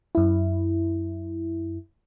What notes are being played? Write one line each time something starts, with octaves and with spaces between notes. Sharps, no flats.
F#2 E4